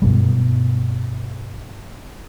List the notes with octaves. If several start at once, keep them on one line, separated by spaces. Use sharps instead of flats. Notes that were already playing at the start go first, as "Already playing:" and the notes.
G2 B2 G3